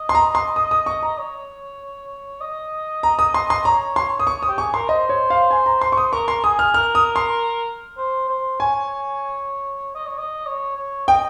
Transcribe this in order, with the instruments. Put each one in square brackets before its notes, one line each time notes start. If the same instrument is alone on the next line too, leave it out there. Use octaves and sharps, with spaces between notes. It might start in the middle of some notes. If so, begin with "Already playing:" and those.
Already playing: [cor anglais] D#5
[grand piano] C6
A#5
C6
D#6
D#6
C#6
A#5
[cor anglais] C#5
D#5
[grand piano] A#5
D#6
C6
C6
[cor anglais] C#5 [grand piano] A#5
[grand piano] C6
D#6
C#6
D#6
[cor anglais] G4
[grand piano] C#6
[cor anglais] G#4
[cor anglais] A#4 [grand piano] C6
[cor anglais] C5 [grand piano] D#5
[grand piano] C#5
F5
G#5
A#5
C6
C#6
D#6
[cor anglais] A#4 [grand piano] C#6
[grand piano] C6
[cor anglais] G#4 [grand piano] D#6
[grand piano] F6
[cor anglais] A#4 [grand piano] F6
[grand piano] D#6
C6
[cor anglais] C5
C5
[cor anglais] C#5 [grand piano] G#5
[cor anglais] D#5
C#5
D#5
C#5
C#5
[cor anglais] D#5 [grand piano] G5